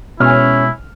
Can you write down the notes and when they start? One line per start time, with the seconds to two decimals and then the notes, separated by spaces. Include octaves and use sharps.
0.20 B2 G#3 C#4 E4 F6